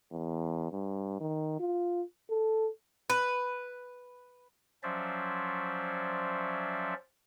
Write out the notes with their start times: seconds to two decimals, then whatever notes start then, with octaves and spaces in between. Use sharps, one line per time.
0.12 E2
0.72 G2
1.21 D#3
1.59 F4
2.30 A4
3.10 B4
4.83 F3 F#3 C#4 C5 D5 E5